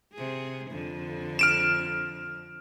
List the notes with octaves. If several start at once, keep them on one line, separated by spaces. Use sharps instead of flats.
C3 G#4
F2 D3
F6 D7 E7